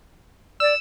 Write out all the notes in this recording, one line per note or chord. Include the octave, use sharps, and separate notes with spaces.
D5 E6